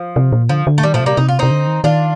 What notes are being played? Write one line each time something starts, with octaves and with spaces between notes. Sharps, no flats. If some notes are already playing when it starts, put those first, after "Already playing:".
Already playing: F3
C3
A#2
D3 F3
D3
A3
D#3 G3
A#2 F3 A3
C3
G3 A#3
C3 D#4
F4
C3 C4 D#4
D3
D#3
D#3 D4 F4